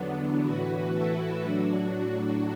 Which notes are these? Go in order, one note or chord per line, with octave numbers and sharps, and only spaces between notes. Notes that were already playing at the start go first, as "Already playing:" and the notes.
Already playing: E2 D3 F#3 B3 D4
A2 E3 F#4 B4
E4 A4
A2 F#3 D4 F#4